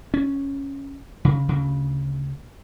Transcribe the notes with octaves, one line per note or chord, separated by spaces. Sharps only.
C#4
C#3
D2 C#3